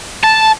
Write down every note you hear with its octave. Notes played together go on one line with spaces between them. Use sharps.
A5